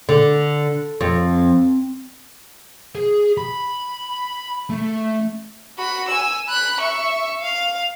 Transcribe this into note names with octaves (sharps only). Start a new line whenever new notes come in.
D3
F2
G#4
B5
A3
F#4 B5
G#5 E6
B5 F#6
E5 C#6
F5